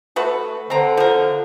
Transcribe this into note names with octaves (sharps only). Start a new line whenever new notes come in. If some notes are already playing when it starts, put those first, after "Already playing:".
A3 F#4 B4
D3 C4 A#5
F3 A#4